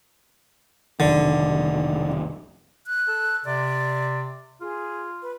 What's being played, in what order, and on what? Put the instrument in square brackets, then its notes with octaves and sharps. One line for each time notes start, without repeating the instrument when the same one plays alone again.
[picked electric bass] F1 B1 D#3 [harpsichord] D3
[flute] F#6
[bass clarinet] A4
[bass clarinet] C3 [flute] D5
[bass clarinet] F4 [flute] G#4
[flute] B4